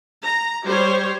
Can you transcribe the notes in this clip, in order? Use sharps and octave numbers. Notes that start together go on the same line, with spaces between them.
A#5
G3 G4 C5 C#5